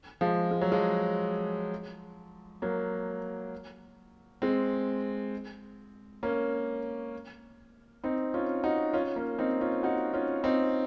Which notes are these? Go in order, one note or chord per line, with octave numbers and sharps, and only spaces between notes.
F3 G#3
G#3
F#3
F3 G#3
F#3 A#3
G#3 C4
A#3 C#4
C4 D#4
C#4 F4
D#4 F#4
C#4 F4
A#3 C#4
C4 D#4
C#4 F4
D#4 F#4
C#4 F4
C4 D#4